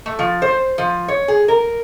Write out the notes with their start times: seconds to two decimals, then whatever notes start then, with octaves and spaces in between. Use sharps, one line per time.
0.06 A3
0.19 F3
0.42 C5
0.78 F3
1.08 C#5
1.28 G#4
1.48 A#4